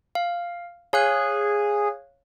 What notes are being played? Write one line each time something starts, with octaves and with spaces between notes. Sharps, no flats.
F5
G#4 C#5 F5 F#6